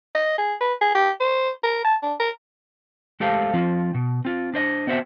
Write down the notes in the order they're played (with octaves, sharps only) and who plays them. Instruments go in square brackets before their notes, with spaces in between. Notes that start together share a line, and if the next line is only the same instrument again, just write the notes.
[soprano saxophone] D#5
G#4
B4
G#4
G4
C5
A#4
A5
D4
A#4
[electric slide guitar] G#3 A3 G4 A4 C5 F5
F3 C4 F4
B2
C4 F4
D4 C5 D#5
B3 C4 F#4 C5 E5